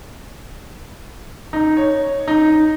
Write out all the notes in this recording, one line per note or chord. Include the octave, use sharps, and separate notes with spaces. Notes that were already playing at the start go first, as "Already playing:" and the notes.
D#4
C#5
D#4